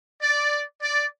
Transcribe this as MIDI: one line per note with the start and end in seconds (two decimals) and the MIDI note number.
0.22 0.62 74
0.82 1.05 74